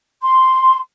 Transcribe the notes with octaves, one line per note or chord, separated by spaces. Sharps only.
C6